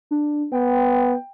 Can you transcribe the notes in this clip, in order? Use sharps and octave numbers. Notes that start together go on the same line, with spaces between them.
D4
B3 G5